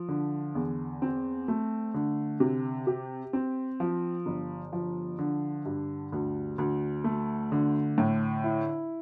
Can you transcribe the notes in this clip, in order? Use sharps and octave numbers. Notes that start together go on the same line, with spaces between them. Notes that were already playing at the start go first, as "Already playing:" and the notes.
Already playing: F3
D3
E2
C4
A3
D3
C3
G4
C4
F3
G1
F3
D3
G2
D2
D2
A3
D3
A2
E4